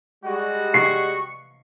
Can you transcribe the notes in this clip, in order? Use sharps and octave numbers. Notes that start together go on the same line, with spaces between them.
G3 G#3 F#4
C#6 C7